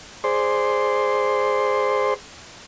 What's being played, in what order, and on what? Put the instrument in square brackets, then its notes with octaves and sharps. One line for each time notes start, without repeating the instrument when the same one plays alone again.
[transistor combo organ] G#4 C5 D5 C6